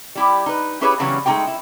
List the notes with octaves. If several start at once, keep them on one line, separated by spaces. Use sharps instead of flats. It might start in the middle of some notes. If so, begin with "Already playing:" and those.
G3 E4 G4
D#4 B4
C#4 E4 G4 G#4 B4 C#5
C#3 E3 F#3 G3 B3 C#4
G#3 A3 D#4 F4 G4 G5
E4